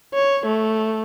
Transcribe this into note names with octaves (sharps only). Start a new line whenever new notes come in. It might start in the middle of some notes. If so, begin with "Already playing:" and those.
C#5
A3